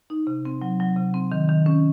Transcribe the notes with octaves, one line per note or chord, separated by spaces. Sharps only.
D#4
C3
C4
F#3
F#3
C3
C4
D#3
D#3
C#4